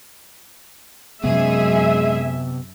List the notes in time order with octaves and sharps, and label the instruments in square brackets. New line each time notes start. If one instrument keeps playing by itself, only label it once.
[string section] F#2 G#4 [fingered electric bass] C3 B3 [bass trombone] G#3 [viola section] E5